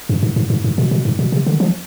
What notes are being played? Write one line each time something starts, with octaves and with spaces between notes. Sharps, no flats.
G2
G#2
G#2
G#2
G#2
B2
B2
G#2
B2
C3
D3
F3